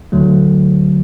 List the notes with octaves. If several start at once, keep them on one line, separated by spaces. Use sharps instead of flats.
D2 D3 F#3 A3